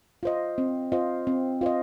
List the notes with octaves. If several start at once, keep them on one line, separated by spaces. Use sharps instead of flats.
F4 C5 D#5
C4
F4 C5 D#5
C4
F4 C5 D#5